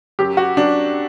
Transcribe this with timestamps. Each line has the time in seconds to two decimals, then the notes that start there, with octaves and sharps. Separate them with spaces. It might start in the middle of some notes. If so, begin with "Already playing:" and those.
0.19 F#2 F#3 G4
0.37 F#4
0.57 F#2 F#3 D4